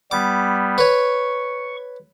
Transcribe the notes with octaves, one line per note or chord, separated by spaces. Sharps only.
G3 B3 D6
B4 C#5 C#6